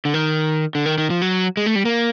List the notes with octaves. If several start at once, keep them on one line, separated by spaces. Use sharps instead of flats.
D3
D#3
D3
D#3
D#3
F3
F#3
G#3
A3
G3
A#3